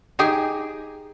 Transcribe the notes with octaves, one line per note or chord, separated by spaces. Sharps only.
D#4 G4 G#4